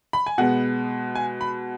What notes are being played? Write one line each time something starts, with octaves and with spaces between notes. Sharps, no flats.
B5
G#5
B2 G#3 B3 F#5
G#5
B5